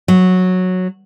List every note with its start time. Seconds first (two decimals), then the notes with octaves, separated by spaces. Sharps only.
0.08 F#3